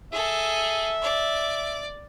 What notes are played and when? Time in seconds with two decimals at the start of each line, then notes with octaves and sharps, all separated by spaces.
0.12 G#4 A4 E5
1.02 D5